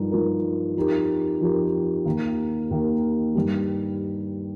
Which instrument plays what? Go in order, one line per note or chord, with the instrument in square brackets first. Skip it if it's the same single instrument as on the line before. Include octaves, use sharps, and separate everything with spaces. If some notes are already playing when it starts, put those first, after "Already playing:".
Already playing: [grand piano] G2 F3 D#4 A#4
G2 F3 D#4 A#4
F2 F3 D#4 G4 A#4
F2 F3 D#4 G4 A#4
D#2 D#3 A#3
D#2 D#3 A#3
G2 D#3 G3